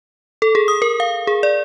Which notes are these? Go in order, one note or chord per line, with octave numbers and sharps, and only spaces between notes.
A4
G#4
D#6
A#4
F5
G#4
D5